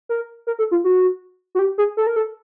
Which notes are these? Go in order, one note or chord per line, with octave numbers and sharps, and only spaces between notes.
A#4
A#4
A4
F4
F#4
F#4
G4
G#4
A4
A#4
A4